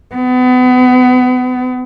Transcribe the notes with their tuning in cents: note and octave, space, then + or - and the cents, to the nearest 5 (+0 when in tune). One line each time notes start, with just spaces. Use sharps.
B3 +30